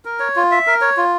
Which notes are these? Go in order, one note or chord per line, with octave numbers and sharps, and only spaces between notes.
A#4
C#5
F4
E5
A#4
C#5
F4